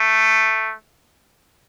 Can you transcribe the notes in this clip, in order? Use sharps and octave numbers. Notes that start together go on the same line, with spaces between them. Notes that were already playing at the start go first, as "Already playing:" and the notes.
Already playing: A3